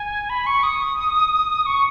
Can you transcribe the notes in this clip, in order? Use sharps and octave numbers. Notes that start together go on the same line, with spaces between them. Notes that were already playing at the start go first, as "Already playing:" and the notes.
Already playing: G#5
B5
C#6
D#6
C#6